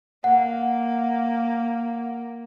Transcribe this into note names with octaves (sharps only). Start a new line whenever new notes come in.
A#3 F#5